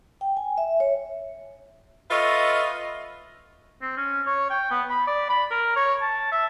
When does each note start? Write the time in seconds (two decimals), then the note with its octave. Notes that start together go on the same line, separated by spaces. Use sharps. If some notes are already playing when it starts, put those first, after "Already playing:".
0.21 G5
0.37 G#5
0.58 E5
0.80 C#5
2.10 F4 A4 B4 C#5 D#5 E5
3.81 C4
3.97 C#4
4.26 C#5
4.50 G5
4.71 B3
4.89 B5
5.07 D5
5.29 B5
5.50 A#4
5.76 C#5
6.01 A5
6.32 E5